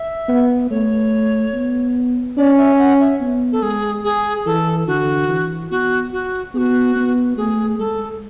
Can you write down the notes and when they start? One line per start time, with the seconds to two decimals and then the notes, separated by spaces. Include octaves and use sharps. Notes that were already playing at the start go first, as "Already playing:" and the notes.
Already playing: E5
0.29 B3
0.70 A3 C#5
1.54 B3
2.37 C#4 D5
2.58 E5
2.79 F#5
3.00 E5
3.21 B3
3.52 A4
3.62 G#3 G#4
4.04 G#4
4.46 E3 A4
4.87 D3 F#4
5.29 E3
5.71 B3 F#4
6.13 F#4
6.54 B3 G#4
6.58 F#4
6.96 B3
7.37 A3 G#4
7.79 G#3 A4